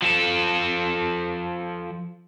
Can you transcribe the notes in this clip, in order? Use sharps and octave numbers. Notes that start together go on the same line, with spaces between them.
F3 A4